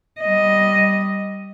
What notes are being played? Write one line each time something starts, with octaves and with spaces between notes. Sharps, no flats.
G3 D#5